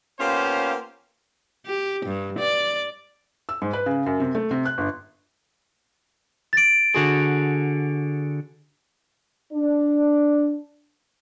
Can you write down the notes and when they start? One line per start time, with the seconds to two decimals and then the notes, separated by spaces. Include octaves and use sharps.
0.20 A#3 B3 C#4 F4 G4 C5
1.66 G4
2.06 G2
2.39 D5
3.49 E6
3.62 G#2
3.73 B4
3.86 C#3
4.06 F#2
4.20 C3
4.35 A3
4.51 C3
4.65 F#6
4.78 G1
6.53 A6 D7
6.95 D3 F#4 G#4
9.53 D4 D5